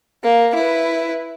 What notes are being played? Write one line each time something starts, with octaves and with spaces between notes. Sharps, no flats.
A#3
E4 B4